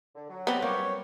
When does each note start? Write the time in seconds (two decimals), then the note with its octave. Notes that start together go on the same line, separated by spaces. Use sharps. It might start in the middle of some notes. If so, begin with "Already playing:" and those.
0.15 D3
0.30 F#3
0.47 B3 C4 B4 D5 A#5
0.62 G3 A#3 G4 C#5